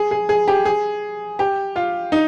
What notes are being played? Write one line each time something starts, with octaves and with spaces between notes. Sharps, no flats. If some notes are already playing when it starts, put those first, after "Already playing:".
Already playing: G#4
G#4
G#4
G4
G#4
G4
F4
D#4